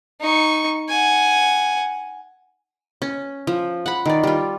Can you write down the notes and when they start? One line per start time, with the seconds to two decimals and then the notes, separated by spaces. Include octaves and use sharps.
0.21 D#4 C#6
0.89 F#5 G#5
3.02 C#4
3.47 F3
3.86 F#5 B5
4.05 D#3 D5
4.23 G3 F4